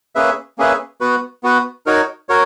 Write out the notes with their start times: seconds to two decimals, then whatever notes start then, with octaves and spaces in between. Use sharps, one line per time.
0.15 A#3 C#4 G#4 B4 E5
0.58 A#3 C#4 G#4 B4 E5
1.01 B3 F#4 B4
1.43 B3 F#4 B4
1.86 D#4 F#4 A#4 C#5
2.29 F#4 A#4 C#5